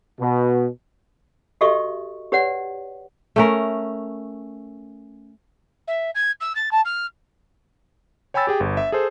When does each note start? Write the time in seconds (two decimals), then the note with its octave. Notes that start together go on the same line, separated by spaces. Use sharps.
0.20 B2
1.61 F#4 G4 A4 D#5 E5 C#6
2.32 G4 B4 C#5 D5 F#5
3.36 A3 C#4 A#4
5.87 E5
6.15 G#6
6.40 E6
6.55 A6
6.71 A5
6.85 F6
8.34 C#5 G5 G#5 B5 E6 A6
8.47 G4 G#4 G5
8.60 G1
8.77 E5
8.92 G#4 A4 C5